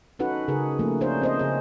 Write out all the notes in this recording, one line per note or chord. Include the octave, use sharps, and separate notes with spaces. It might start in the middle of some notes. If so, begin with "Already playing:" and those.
C#4 D#4 F#4 A4 B4 F#5
C#3 G#4 A#4
F3 A3 A#3
C#4 D4 G#4 A#4 C5 C#5
C4 C5 D#5
C#3 G#4 D#5